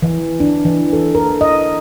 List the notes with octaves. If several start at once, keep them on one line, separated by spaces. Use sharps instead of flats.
E3
D4
E3
A4
A#4
D#5